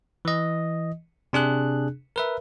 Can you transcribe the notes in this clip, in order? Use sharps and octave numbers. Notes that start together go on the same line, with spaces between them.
E3 D#5
C3 D4 G#4 F#6
A#4 B4 E5